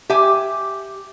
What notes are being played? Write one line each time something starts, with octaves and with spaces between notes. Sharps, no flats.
G4 E5 G#5